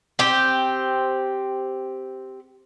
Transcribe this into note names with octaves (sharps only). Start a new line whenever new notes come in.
C4 G4